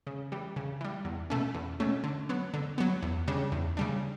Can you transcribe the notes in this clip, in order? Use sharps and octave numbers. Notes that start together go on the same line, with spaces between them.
C#3
E3 G3
C#3
E3 G3
E2
B2 A3 C#4
E2
B2 A3 C#4
D3
F#3 B3
D3
F#3 B3
E2
C#3 G3 D4
E2
C#3 G3 D4